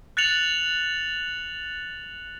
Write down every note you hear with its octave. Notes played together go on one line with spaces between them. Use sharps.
F#6 A6 C#7 F7 F#7